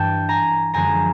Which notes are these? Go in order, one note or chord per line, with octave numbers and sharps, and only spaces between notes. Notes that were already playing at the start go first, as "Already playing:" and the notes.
Already playing: G2 E3 G3 G5 A5
G#5 A#5
F#2 D3 F3 G#3 G#5 A#5